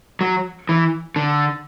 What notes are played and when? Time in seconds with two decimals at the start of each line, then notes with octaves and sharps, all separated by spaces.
0.21 F#3
0.69 E3
1.16 D3